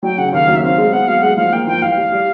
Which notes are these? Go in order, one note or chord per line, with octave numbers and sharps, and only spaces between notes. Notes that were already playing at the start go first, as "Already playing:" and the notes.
F#3 G5
C#3 F#5
D#2 F5
F#3
E5
C4 F5
G#3
B3 F#5
F#3 F5
G#3 F#5
F3 F5
A#3 G5
F3 G5
C2 F5
G3
G3